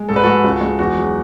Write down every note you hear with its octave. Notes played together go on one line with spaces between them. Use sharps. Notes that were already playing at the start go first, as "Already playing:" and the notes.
Already playing: G#3
G#2 A4
B4
G#3 F#4 A4
C#2
G#3
E2 F#4
F#3